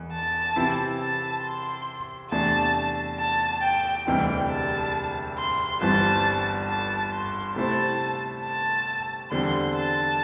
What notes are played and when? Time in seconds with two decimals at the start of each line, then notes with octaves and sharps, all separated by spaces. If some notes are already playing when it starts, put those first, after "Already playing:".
Already playing: E1 E2
0.13 A5
0.56 C3 E3 C4 E4
1.00 A5
1.44 C6
2.31 E2 C3 A3 D4 A5
3.19 A5
3.62 G5
4.06 E1 D2 C3 E3 G3 G5
4.50 A5
5.38 C6
5.81 G1 G2 E3 G3 C4 A5
6.69 A5
7.13 C6
7.56 C3 A3 E4 A4 C5 A5
8.44 A5
9.31 E2 D3 G3 C4 C6
9.76 A5